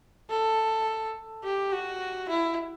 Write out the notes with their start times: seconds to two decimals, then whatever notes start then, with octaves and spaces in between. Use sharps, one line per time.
0.29 A4
1.44 G4
1.72 F#4
2.29 E4